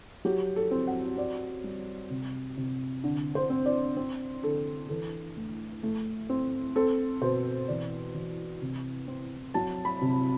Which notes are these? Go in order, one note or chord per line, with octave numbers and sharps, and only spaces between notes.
F#3 G4
A4
C4
F#5
C4 D5
G3
C3
C3
D3
C5
C4
D5
C4
D3 A4
E3 A4
A3
A3
C4
C4 A4
B2 C5
E3 D5
E3
C3
C4
F#3 A5
B5
C3